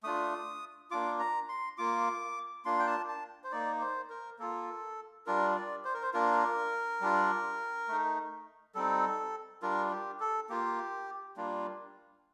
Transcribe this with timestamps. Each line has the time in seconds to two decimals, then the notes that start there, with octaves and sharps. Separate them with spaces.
0.03 A3 D4 F4 D#6
0.91 A#3 D4 F4 D6
1.19 A#5
1.49 C6
1.78 A#3 F4 D6
2.65 A#3 D4 F4 C6
2.79 G5
2.87 A5
3.08 A5
3.44 C5
3.52 A#3 D#4 D5
3.81 C5
4.10 A#4
4.39 A#3 F4 A4
5.26 G3 D4 F4 A#4
5.56 D5
5.85 C5
5.94 A#4
6.02 C5
6.14 A#3 D4 F4 A#4
7.01 G3 D4 F4
7.88 A3 D#4
8.75 G3 C4 D#4 A4
9.62 G3 D4 F4 A#4
9.91 G4
10.20 A4
10.50 A#3 F4 G4
11.37 G3 A#3 D4 F4